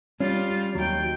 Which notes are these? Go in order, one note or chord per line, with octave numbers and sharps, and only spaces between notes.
G3 C#4 F4
D#2 F#3 G5